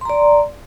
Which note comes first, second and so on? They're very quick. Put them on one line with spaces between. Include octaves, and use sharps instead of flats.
C6 A#5 D5